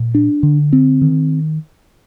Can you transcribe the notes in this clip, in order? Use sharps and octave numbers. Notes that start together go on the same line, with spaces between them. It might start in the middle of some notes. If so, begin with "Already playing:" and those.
Already playing: A#2
D4
D3
C4
D#3